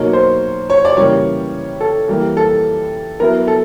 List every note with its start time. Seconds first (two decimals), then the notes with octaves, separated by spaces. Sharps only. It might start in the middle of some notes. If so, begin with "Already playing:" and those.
Already playing: B2 F#3 A#3 D#4 C#5
0.13 C5
0.70 C#5
0.85 D5
0.97 C#3 E3 G3 A#3 C#5
1.81 A4
2.08 E3 G3 A#3
2.37 A4
3.20 F#3 B3 E4 A#4
3.48 A4